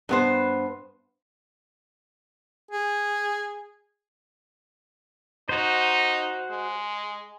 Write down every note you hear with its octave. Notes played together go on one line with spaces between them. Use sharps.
G2 B3 C5
G#4
D#4 F#4 C5
G#3